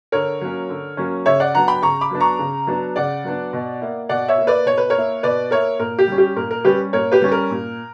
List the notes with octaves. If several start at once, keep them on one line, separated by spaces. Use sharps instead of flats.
D3 A#4 C#5
F#3 A#3 C#4
D3
F#3 A#3 C#4
C#3 C#5 E5
D5 F#5
F#3 B3 D4 F#5 A#5
G5 B5
C#3 A#5 C#6
B5 D6
F#3 B3 D4
A#5 C#6
C#3
F#3 B3 D4
C#3 D5 F#5
F#3 B3 D4
B2
A#3 E4
B2 D5 F#5
C#5 E5
A#3 E4
B4 D5
B2 C#5
B4
A#4 C#5
A#3 E4
B2 B4 D5
A#3 E4 A#4 C#5
A#2 A#4
G4
G3 C#4
G4
A#2 A#4
A#4
G3 C#4 G4 B4
A#2 A#4 C#5
G4 B4
G3 C#4
A#4
A#2